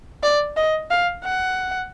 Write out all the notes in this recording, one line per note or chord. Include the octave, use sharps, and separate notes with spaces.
D5
D#5
F5
F#5